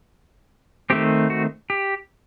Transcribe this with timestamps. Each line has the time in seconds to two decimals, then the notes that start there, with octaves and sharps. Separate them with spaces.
0.90 D#3 A3 C4 G4
1.30 F#4
1.70 G4